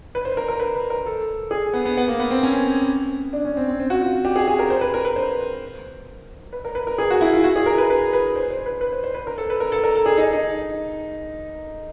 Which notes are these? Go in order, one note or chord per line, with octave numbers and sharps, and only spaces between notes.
B4
C5
A#4
A#4
B4
B4
A#4
A4
G#4
B3
B3
B3
A#3
B3
C4
C#4
D4
C#4
C4
C4
C4
F#4
F4
G4
G#4
G#4
A#4
C5
B4
A#4
B4
C5
B4
A#4
B4
A#4
G#4
F#4
E4
F4
F#4
G#4
A#4
B4
B4
B4
C5
C5
B4
B4
C5
C5
B4
A#4
A4
B4
A#4
A4
A#4
A4
G#4
D#4
D#4